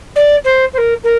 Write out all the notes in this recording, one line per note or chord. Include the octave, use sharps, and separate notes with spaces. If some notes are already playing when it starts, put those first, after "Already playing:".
D5
C5
C5
A#4
A#4